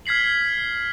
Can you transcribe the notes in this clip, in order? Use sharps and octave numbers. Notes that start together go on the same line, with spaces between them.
F6 G#6 B6 C7 F#7